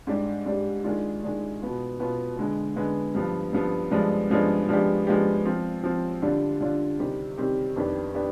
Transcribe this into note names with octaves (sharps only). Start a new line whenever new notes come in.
G#2 G3 D4 G4
G#2 G3 D4 G4
D#3 G#3 D4 F4
D#3 G#3 D4 F4
B2 B3 F4
B2 B3 F4
D3 G#3 B3
D3 G#3 B3
G2 F3 B3
G2 F3 B3
G2 F3 G#3 B3 D4
G2 F3 G#3 B3 D4
F3 G#3 B3 D4 G4
F3 G#3 B3 D4 G4
F3 C4 F4
F3 C4 F4
D3 G3 D4 F4
D3 G3 D4 F4
C3 D#3 G3 C4 G4
C3 D#3 G3 C4 G4
F2 D#3 B3 D4 G4
B3 D4 G4